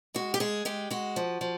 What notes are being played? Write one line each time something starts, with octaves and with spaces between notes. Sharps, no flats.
G#3 F#4
G4
G#3 G#4
G#3 G4
G#3 F#4
F3
F3